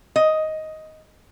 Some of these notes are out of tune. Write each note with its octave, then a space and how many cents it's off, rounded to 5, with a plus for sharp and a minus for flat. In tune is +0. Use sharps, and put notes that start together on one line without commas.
D#5 +10